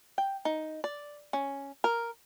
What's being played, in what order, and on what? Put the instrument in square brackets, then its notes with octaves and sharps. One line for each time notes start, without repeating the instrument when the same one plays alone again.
[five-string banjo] G5
D#4
D5
C#4
A#4